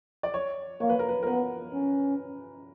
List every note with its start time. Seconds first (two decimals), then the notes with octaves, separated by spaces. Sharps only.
0.23 D5
0.34 C#5
0.80 A#3 C#5
0.89 B4
0.99 A#4
1.08 B4
1.23 A#4
1.27 B3 B4
1.73 C#4